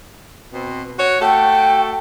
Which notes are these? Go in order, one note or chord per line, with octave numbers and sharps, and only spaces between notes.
B2 C4
F#4 C#5
A3 F#4 A4 G5